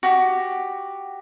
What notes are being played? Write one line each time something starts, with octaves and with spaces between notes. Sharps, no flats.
F#4 G4